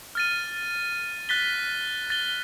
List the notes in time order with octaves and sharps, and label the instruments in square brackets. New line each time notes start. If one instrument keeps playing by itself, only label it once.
[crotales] F6 A6 D#7
F#6 A6 B6 G7
A6 G7